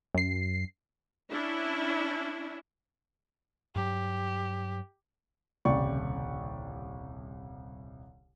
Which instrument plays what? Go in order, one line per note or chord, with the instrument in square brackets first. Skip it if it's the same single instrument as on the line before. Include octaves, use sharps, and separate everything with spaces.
[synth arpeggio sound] F#2 C7
[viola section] C#4 D4 E4
[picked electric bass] G2 F#3 [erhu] G4
[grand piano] D#1 C2 C#3 D5 G5 C#6